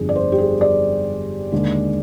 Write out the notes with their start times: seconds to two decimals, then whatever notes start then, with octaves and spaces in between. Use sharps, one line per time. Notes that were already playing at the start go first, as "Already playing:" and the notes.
Already playing: G1 F2 D3 G3 G#4
0.09 D5
0.15 C5
0.32 G4
0.38 G#4
0.61 D5
1.52 D#2 D3 G#3